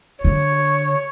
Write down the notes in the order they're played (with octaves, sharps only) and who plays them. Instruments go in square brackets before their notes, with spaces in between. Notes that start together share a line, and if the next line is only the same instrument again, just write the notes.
[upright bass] D3 [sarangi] C#5